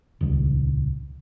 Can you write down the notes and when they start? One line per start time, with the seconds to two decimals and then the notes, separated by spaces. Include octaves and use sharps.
0.21 D#1 C#2